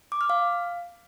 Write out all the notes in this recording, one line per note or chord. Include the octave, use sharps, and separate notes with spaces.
D6
F6
F5